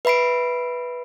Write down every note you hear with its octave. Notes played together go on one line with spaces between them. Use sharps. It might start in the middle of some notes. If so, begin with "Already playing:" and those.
B4 E5 B5 C7 D7